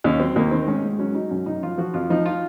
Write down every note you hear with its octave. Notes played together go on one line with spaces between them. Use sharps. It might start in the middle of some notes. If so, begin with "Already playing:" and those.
D#2 C#4
F#3 C4
D#2 A#3
D#3 C4
G#2 C#4
G#2
F#3 C#4
F#3 D#4
F#2 C#4
F#2 D#4
F3 F4
F3 F#4
F2 F4
F3 D#4
F4